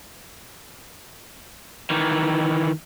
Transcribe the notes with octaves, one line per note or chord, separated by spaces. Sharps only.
D#3 E3